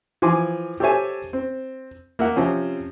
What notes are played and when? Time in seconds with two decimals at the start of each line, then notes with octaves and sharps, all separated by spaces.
0.22 E3 F3 G#5 C6 D6
0.80 G4 A4 C5 C#5 E5 G#5
1.33 C4
2.19 A#3 E5 F#5
2.36 C3 F3 C4 C#4